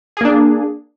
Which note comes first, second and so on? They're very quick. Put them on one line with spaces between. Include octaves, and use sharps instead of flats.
G#4 A#3 D4